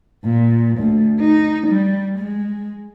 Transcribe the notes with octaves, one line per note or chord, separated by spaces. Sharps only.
A#2
D2
D#4
G3
G#3